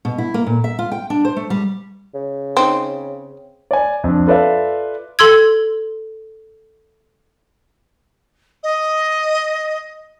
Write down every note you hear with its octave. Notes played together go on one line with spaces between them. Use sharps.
B2
E4
A#3
A#2
E5
F4
G5
D4
C5
A3
G3
C#3
C4 D#4
D5 G#5
F2 D4
F4 A4 B4 D5 E5 F5
A4 C6 E6 G#6
D#5